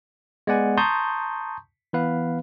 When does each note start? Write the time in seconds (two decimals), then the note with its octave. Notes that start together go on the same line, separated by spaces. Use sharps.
0.47 G#3 B3 D5 F#5 G#5
0.77 A5 A#5 C6 C#6 D#6 G6
1.93 E3 B3 B4 F5